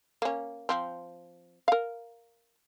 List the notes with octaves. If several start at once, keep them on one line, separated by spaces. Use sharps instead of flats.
A#3 C#4
F3 C4
A#4 F5